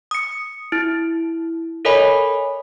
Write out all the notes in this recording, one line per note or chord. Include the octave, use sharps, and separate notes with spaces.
D#6 C#7
E4
A4 A#4 C#5 D#5 G#5 B5